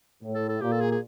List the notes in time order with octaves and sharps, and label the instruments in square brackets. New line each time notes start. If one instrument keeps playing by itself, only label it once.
[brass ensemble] A2
[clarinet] A4
A4
[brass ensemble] A#2 [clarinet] G4
[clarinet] A4
G#4
G#4